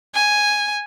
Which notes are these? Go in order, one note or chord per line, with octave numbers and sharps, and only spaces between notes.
G#5